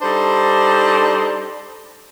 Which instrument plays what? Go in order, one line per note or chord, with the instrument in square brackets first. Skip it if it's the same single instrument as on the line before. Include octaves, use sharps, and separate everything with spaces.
[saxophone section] G3 D4 D#4 A4 C5